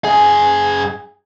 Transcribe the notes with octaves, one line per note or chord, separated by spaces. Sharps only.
F#2 G#4